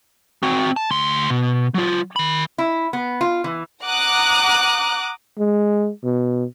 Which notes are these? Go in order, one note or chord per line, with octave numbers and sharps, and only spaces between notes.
C4 F#4
A5
D2 C6
B2
F#3 F4
D#3 B5
E4
B3
F4
E3
F#5 A#5 D6 D#6 F#6
G#3
B2